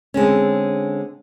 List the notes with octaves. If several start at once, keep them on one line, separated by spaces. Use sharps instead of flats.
D3 G#3 C4 C#4